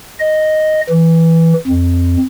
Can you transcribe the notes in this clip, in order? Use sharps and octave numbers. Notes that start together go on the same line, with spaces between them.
D#5
E3
F2